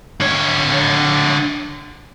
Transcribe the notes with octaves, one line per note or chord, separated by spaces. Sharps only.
D3 C#5